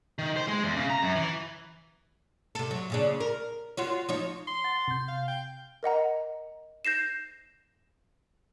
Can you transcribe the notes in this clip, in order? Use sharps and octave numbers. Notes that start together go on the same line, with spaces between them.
D#3
C5
G#3
E2
C#3
A#5
F#2
E3
C3 A4
F#3
A#2 C#3 D4
A#4
F4 F#4 C#5
F3 D#4 C#5
C6
F#5 A6
C3 G6
F5
G5
A#4 D#5 F#5 A#5
G6 A#6 C7 E7